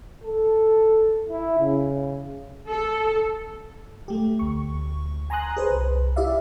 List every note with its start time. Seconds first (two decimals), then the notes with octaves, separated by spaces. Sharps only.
0.24 A4
1.29 E4
1.59 C#3
2.68 A4
4.08 A3 G4
4.39 D2 C#6
5.30 G#5 A#5 C6 D#6 F#6
5.57 G#4 B4 C5
5.71 C2
6.16 E4 G4 D5 E5 F5